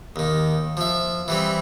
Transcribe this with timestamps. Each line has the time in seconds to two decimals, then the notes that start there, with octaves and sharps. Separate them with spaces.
0.16 D#2 D#3
0.77 F3 E5
1.28 E3 G3 C4